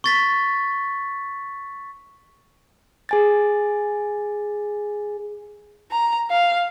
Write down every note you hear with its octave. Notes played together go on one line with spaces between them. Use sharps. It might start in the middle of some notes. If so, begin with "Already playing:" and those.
C#6 A6 B6
G#4 G#5 A6
A#5
F5